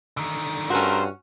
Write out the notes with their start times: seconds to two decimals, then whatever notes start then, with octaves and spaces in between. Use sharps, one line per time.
0.17 D3 D#3
0.70 G2 A3 C#4 F#4 A#4 C5